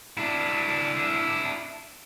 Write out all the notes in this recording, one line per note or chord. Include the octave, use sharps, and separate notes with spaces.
D4 E4